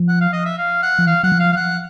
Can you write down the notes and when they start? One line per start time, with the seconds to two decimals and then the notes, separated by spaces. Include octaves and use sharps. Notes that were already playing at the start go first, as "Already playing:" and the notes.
Already playing: F3
0.08 F#5
0.21 F5
0.33 D#5
0.45 E5
0.58 F5
0.82 F#5
0.99 F3
1.07 E3 F5
1.23 F#3 F#5
1.32 F3
1.39 F5
1.52 F5
1.56 F#5